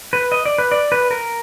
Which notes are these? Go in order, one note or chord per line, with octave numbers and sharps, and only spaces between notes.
B4
D#5
D5
B4
D5
B4
A#4